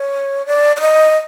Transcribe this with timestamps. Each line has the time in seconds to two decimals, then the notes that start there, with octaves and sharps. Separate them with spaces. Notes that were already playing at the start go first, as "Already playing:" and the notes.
Already playing: C#5
0.46 D5
0.76 D5
0.81 D#5